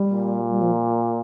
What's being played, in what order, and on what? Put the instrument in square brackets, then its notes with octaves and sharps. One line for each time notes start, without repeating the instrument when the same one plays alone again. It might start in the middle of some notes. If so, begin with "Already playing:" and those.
Already playing: [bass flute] G3
[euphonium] A#2
[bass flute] G3
F3